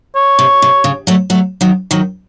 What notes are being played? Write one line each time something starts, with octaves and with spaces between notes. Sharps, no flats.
C#5
C3
C3
C#3
F#3 A3
F#3 A3
D#3 F#3
D#3 F#3